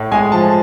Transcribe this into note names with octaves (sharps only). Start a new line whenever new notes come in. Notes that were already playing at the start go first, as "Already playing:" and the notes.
Already playing: A2
G#3 G#5
F3 A5